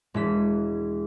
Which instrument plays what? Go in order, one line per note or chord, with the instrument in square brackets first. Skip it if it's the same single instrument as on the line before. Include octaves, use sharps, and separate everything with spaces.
[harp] E1 E3 B6